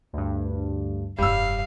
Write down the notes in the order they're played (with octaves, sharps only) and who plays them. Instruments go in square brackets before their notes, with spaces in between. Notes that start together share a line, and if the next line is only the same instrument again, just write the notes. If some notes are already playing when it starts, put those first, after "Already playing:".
[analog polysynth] D2 G2
[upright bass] F1 G2 [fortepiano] G3 E6 [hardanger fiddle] F5